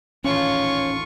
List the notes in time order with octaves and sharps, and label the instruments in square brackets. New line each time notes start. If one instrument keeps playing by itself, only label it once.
[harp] D#1 A1 F5 [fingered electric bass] C#4 [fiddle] F4 C#6 [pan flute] C#5